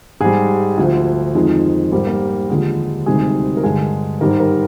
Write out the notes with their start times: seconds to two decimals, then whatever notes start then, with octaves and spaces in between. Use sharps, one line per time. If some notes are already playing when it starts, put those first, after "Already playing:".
0.21 G#2 G3 G#3 G#4
0.78 D2 D3 F3
1.35 F2 D#3 G#3
1.92 G#2 G3 A#4
2.07 A#3 A#4
2.50 D#2 D3 F3 G#3
3.06 D2 C3 D#3 G3 G#3 G#4
3.57 A#4
3.63 G2 D3 G#3 G#4
4.21 G#2 D#3 G3 A#4
4.40 A#4